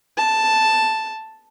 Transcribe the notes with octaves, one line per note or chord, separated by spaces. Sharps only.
A5